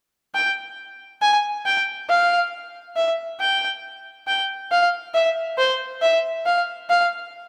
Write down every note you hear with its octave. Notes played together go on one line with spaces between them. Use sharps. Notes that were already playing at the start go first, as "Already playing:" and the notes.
G5
G#5
G5
F5
E5
G5
G5
F5
E5
C5
E5
F5
F5